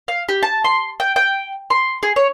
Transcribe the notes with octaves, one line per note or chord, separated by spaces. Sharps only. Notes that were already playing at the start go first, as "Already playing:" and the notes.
F5
G4
A5
C6
G5
G5
C6
G#4
C#5